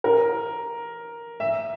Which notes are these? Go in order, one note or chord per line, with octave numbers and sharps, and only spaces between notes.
A#4
E5